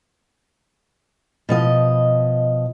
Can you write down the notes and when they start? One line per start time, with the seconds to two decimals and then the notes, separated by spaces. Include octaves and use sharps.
1.49 B2 F3 D#5